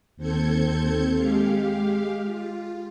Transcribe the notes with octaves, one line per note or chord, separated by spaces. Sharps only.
D#2 C4 A4 G6 G#6 C#7
G#3 G4 F5
F4